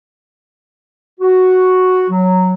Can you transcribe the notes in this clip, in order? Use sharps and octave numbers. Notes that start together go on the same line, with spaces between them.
F#4
F#3